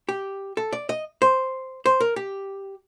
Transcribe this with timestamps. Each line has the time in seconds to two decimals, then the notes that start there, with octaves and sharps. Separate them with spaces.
0.09 G4
0.57 A4
0.73 D5
0.89 D#5
1.22 C5
1.86 C5
2.00 A#4
2.16 G4